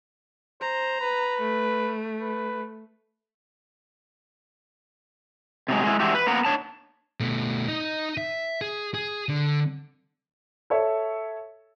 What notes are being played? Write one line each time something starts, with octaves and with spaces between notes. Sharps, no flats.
C5 A#5
B4
A3
B4
C3 F#3 G#3
G#3 E4
E3 G#3 D4 E4 F#4 G4
B4
A#3 B3 A#4 F#5
D4 C#5 A5
B2 A3
D#4 D#5
E5
G#4
G#4
D3
A4 C#5 E5